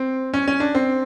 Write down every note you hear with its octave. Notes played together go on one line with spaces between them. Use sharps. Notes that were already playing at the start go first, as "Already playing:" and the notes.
Already playing: C4
C#4
C#4
D4
C4